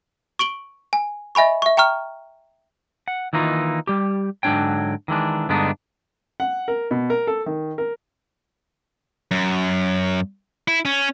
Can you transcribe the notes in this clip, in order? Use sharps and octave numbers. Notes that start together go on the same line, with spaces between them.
C#6 D7 F#7 G7
G#5
D#5 E5 G#5 B5 C#6
E5 C#6
G5 A#5 C#6 F6
F#5
D#3 E3 A#3 D#4 F4
G3 G4
G#2 D3 F#3 D4 C#5 G5
D#3 E3 G#3 D4
G2 D3 G#3 B3 D4 D#4
F#5
A#4
B2
A#4
A4
D#3
A#4
F#2
E4
C#4